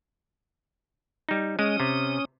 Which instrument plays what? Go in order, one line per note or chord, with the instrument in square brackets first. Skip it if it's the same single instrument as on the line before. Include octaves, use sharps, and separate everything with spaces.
[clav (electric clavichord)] G3 D#4
[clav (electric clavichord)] G#3 [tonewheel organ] C#4 D#6
[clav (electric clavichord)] C3